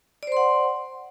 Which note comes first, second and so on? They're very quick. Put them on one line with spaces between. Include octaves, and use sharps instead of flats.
D5 C5 C6 F#5